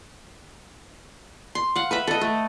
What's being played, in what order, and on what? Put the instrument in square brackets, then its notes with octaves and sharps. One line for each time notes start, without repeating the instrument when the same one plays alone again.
[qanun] C6
F5 F#5
B4 E5 B5
A4 D#5
A3